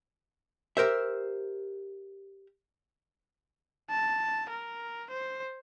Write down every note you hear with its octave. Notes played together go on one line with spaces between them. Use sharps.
G4 A#4 C5 E5
A5
A#4
C5